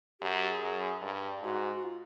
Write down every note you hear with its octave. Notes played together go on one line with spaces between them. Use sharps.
F#2 G4
G4
G#4
F#2
G2
G#2 F#4
F#4
F4